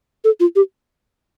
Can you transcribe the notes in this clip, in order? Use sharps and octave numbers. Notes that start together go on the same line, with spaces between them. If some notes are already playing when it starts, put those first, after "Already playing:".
A4
F4
G4